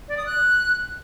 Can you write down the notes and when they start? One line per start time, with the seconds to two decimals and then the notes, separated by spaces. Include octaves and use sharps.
0.08 D5
0.17 D#6
0.26 F#6